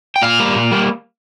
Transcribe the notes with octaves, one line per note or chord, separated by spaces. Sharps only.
G5
A#2 F5
G3 A#3
A#2
G3 A#3